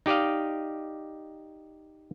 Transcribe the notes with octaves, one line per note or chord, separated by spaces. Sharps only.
D#4 G4 D5 D#5 F5